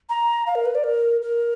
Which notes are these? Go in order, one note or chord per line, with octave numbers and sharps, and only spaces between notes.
A#5
F5
A#4
B4
D5
A#4
A#4